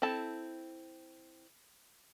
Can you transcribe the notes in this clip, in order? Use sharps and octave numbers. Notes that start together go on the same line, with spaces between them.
C4 E4 A4 A5